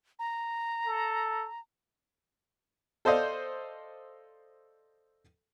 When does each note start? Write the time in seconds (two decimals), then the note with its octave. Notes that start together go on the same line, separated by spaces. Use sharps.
0.19 A#5
0.86 A4
3.05 A4 C5 D5 D#5 F5